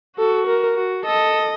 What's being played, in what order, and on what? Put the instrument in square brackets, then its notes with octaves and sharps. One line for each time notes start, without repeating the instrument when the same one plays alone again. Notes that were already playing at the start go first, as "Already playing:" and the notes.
[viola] F#4 [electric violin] A4
[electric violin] A#4
[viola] F#4
[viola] A4 [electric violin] D#5